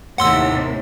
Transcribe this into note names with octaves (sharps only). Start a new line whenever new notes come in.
D#2 A2 C3 F#5 C6 E6